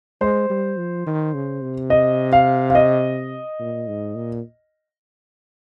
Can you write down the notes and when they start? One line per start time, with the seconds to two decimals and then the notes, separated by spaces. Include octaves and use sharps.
0.21 G#3 C5
0.50 G3
0.77 F3
1.06 D#3
1.34 C#3
1.62 C3
1.90 D#5
2.33 F5
2.70 F5
2.75 D#5
3.60 A#2
3.88 G#2
4.15 A#2